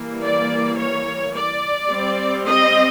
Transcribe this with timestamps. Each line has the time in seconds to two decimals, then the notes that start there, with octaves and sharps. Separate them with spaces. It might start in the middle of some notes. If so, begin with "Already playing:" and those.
Already playing: E3 G3 A#3
0.23 D5
0.78 C#5
1.34 D5
1.89 G3 C4
2.45 D#5